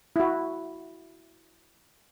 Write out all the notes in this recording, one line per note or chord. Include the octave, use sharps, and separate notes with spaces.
E4 F#4